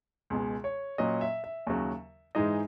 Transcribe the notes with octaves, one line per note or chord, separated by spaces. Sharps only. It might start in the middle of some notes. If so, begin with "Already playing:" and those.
C#2 B2 G#3
C#5
A#2 F#3 C#4 D#5
E5
E5
D#2 C#3 F#3
G#2 E3 G#3 D#4 D#5